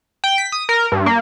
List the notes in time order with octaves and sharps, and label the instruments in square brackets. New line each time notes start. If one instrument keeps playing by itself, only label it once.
[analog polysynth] G5
B6
D#6
A#4
G2
A#3